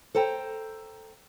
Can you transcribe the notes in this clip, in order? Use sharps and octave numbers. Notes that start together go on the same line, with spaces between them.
A4 C5 G5 A#5